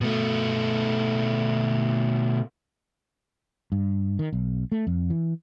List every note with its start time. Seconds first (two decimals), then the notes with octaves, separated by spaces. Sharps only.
0.01 B2 A3
3.72 G2
4.19 D#3
4.33 B1
4.72 A3
4.87 F2
5.10 E3